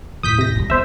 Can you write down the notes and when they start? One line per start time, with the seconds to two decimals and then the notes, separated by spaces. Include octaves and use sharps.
0.23 D#2 A2 D#6 G6 B6
0.38 C3 A#6
0.56 G2 G3
0.70 B3 C5 E5